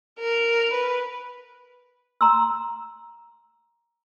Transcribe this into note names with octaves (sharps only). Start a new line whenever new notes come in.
A#4
B4
A#5 C6 E6